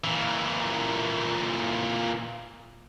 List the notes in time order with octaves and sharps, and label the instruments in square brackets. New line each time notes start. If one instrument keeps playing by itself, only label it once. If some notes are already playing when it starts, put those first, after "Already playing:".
[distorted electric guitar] A#2 E3